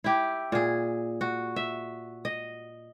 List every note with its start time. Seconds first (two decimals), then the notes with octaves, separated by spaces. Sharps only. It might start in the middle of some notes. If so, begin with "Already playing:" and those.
0.04 E4 G4
0.52 A#2 G#4
1.21 F#4
1.56 E5
2.25 D#5